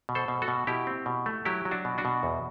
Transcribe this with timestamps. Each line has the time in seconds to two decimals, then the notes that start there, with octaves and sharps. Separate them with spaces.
0.09 B2
0.15 A4 C5
0.28 B2
0.42 F#4 A4
0.48 B2
0.67 B2 E4 G4
0.87 C4
1.06 B2
1.26 A3
1.45 F#3 E4 G4
1.65 F#3
1.71 D4 F#4
1.85 B2
1.98 D4 F#4
2.05 B2
2.23 E2